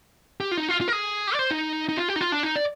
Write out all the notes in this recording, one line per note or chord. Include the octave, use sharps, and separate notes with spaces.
G4
F4
D#4
F4
F4
A#4
G#4
G4
D5
C5
D#4
D#4
F4
G4
D#4
F4
D4
D#4
D5